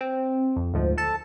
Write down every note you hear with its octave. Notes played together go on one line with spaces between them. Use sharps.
C4
F2
D2 G#2 F3
A4 A5